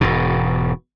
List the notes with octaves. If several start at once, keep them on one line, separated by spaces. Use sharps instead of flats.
E1 G#2 B2